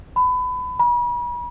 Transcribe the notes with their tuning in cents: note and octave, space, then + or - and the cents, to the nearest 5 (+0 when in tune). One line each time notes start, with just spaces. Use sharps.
B5 +25
B5 -40